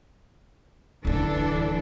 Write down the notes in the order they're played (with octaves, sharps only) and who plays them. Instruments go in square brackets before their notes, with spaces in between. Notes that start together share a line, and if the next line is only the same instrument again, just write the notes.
[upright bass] D1 D3 [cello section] E3 D4 A4